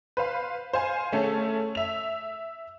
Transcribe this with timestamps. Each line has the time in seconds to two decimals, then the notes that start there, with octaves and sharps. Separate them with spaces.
0.17 B4 C5 F5 B5
0.73 C5 F5 G#5
1.12 A3 C#4 G#4 A4
1.75 E5 F7